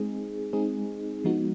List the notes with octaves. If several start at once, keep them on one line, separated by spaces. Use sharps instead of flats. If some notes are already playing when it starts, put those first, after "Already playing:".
Already playing: G#3 C4 D#4 G#4
G#3 C4 D#4 G#4
F3 G#3 B3 D#4 F#4